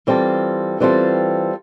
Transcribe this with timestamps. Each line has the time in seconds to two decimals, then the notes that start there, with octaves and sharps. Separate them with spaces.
0.07 E3 G3 C4 F4 A4
0.80 E3 G3 C4 F4 A4